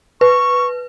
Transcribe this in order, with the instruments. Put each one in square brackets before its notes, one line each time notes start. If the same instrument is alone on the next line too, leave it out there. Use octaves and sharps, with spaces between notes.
[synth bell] B4 [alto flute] C#6